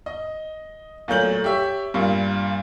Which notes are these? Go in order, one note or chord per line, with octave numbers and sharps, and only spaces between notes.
D#5
A#2 F#3 A3 G6 F#7
G4 C#5 E5
G2 A#2